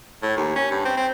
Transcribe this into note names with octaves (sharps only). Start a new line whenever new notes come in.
A2
D#2
C#4
G2
C4
C4